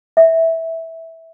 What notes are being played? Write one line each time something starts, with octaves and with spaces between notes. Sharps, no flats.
E5